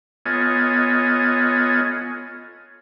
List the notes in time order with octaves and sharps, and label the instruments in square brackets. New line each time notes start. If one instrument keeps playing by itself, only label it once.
[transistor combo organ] B3 F4 A4 C#5 D#5 G#5